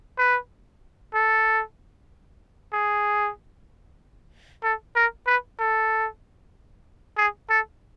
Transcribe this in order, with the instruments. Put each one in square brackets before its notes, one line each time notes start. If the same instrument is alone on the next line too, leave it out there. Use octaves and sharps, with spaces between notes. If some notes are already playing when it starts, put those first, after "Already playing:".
[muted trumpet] B4
A4
G#4
A4
A#4
B4
A4
G#4
A4